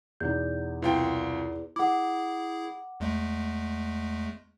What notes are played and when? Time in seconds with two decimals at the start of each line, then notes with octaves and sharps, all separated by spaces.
0.20 E2 B2 D#4 G6
0.82 C2 E4 F4 B4 G5
1.76 E4 G#4 F#5 D6
3.00 E2 G#3 A3